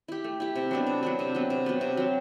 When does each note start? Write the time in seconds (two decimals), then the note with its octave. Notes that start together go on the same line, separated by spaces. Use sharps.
0.08 E4 G4
0.24 A3
0.40 E4 G4
0.56 C3
0.71 F#3 B3 D4
0.87 C3
1.03 F#3 B3 D4
1.19 C3
1.34 F#3 B3
1.50 C3
1.66 F#3 B3
1.81 C3
1.97 F#3 C4